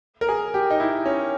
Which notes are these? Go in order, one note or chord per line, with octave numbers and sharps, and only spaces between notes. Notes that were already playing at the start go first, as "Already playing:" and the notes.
A#4
G#4
G4
D#4
E4
C#4